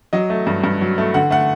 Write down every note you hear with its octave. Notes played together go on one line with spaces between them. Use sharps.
F#3 D#5
A3
G2
G2
F#3
A3
D3 F#5
A3 F#5